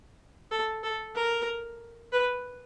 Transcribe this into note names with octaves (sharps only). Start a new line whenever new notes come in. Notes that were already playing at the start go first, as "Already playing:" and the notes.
A4
A4
A#4
B4